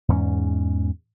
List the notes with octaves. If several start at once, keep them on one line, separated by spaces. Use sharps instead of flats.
E2 G#2 G3 C#4